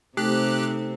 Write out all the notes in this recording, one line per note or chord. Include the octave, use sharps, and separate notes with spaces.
C3 A3 C4 D#4 G4 A4 F#6